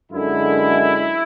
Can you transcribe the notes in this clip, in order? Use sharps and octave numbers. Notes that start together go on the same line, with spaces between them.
F#2 D3 G#3 E4